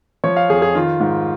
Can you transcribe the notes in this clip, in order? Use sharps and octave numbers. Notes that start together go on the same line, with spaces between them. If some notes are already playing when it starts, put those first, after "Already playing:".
F3 C#5
F5
F2 G#4
G#4
D#3 F4
G#2